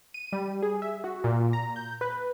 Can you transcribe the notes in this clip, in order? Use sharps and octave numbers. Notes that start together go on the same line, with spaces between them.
D#7
G3
G#4
E5
F#4
A#2
A#5
G6
B4